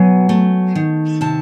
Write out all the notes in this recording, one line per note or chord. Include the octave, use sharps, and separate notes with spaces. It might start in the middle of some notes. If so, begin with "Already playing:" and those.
Already playing: B2 F#3 G#5
A3
D#3
C3 A5